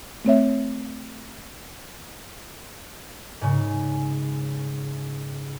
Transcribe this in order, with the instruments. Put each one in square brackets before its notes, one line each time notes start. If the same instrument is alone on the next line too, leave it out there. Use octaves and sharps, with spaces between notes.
[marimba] A3 C4 C#5 E5
[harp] G#2 C#3